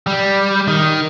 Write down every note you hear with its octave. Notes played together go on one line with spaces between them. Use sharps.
G3
D#3